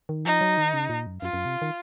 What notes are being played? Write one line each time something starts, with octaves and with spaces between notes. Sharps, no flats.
D#3
F3 D#4
F#3
D#3
C#3
A#2
F#2
F#2 F4
F#2
C3
D#3